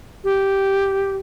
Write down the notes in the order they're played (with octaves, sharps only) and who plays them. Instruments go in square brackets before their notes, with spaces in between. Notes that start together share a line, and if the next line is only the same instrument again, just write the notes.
[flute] G4